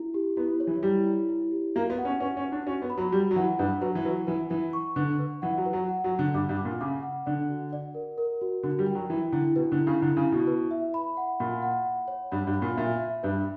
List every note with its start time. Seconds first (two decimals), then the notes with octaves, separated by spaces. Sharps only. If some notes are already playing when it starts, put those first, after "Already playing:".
Already playing: E4
0.14 G4
0.37 B3 E4
0.60 C#5
0.67 E3
0.83 G3 E4
1.06 E4
1.29 E4
1.52 G4
1.75 A#3 F#4
1.90 B3
1.98 F#5
2.05 C#4
2.20 C#4 B4
2.37 C#4
2.43 B4
2.52 D4
2.67 C#4 F#4
2.82 B3
2.90 B5
2.97 F#3
3.12 G3 F#4
3.31 F#3
3.36 E3 F#5
3.59 G2 B4
3.81 F#3 B4
3.95 E3
4.05 F#3 B4
4.27 E3 B4
4.50 E3 B4
4.73 C#6
4.96 D3 B4
5.19 B4
5.42 E3 F#5
5.58 F#3
5.66 B4
5.73 F#3
5.89 F#5
6.04 F#3
6.12 F#5
6.19 D3
6.34 G2 D6
6.49 G2
6.57 D6
6.65 A#2
6.81 C#3 D6
7.03 F#5
7.26 D3 D5
7.49 F#4
7.73 D5
7.94 A#4
8.18 A#4
8.41 F#4
8.63 D3 F#4
8.79 G3
8.87 G5
8.95 F#3
9.10 E3 E4
9.32 D3 E4
9.56 B2 B4
9.72 D3
9.79 E4
9.87 C#3
10.02 D3 E4
10.17 C#3
10.25 E4
10.32 B2
10.47 B4
10.71 E5
10.94 B5
11.17 F#5
11.40 A#2 B5
11.62 F#5
11.85 F#5
12.08 C#5
12.31 G2 B5
12.47 G2
12.54 B5
12.62 A#2
12.77 A#2 E5
13.00 E5
13.23 G2 B4